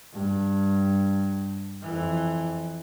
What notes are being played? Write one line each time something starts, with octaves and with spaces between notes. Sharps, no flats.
G2
F2 E3